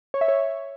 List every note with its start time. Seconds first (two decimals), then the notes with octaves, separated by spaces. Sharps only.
0.14 C#5
0.21 E5
0.28 C#5